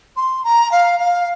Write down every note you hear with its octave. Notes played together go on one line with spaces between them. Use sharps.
C6
A#5
F5
F5